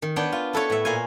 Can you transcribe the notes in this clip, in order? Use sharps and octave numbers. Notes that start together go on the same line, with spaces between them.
D#3
B3 D4 C#5 G5
F4
E4 A4 B4 C#5
A2 E5
A#2 F5 G#5